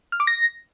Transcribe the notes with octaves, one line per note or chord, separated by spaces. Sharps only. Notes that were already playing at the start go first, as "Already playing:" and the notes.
F6
D6
A#6